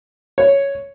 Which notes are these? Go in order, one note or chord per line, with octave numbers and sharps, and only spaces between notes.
C#5